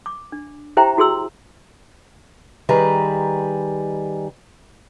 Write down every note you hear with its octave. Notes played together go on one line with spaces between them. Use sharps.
D6
D4
E4 G4 C5 E5 G5 A#5
E4 F#4 G#4 C6 E6
D#3 G3 G#4 B4 D#5 A#5